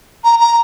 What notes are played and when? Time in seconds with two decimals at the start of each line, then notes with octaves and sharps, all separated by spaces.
0.24 A#5
0.40 A#5